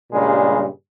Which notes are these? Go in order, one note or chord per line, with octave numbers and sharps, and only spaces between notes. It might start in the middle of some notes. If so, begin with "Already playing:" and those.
G2 A#2 C#3 G3 G#3